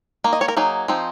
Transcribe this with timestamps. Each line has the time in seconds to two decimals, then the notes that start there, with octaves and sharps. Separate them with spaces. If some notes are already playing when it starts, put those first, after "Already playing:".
0.24 D#3 A#3
0.33 D#5
0.41 C#5
0.48 A#4
0.57 F#3 A#3 D#4 G#4
0.88 F3 C4 D#4